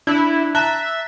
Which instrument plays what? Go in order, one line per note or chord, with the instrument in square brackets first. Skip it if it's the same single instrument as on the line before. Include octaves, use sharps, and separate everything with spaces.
[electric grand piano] D4 [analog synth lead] E4
[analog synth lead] E5 [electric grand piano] A5 A#5 F#6